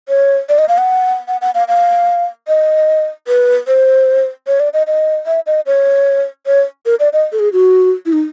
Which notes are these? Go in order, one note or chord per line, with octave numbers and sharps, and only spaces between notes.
C#5
D5
D#5
F5
F#5
F#5
F#5
F5
F5
D#5
B4
C5
C#5
D5
D#5
D#5
E5
D#5
C#5
C#5
A#4
D5
D#5
A4
G#4
F#4
E4
D#4